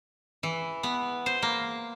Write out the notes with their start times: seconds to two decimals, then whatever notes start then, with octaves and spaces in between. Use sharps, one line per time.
0.43 E3
0.83 B3
1.26 C5
1.42 A#3